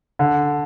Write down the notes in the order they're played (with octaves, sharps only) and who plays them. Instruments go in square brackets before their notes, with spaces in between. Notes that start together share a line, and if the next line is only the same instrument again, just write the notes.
[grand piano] D3